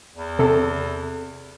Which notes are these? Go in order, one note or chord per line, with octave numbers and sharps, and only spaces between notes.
E2
C3 A4